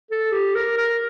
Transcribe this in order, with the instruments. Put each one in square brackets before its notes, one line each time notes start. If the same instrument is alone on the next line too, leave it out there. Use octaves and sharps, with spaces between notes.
[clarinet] A4
G4
A#4
A#4